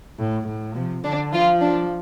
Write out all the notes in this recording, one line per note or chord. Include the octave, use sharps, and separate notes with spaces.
A2
A2
C3 F3
D3 D4
F3 F4
D4